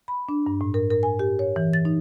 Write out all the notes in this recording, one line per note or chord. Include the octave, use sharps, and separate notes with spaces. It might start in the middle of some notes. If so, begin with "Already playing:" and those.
B5
D4
G2
A2
A#4
A#4
G#5
G4
C#5
E3
A6
D#4